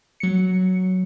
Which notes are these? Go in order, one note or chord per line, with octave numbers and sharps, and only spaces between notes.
F#3 C#7